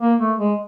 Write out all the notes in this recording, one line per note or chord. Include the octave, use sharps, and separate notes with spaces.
A#3
A3
G#3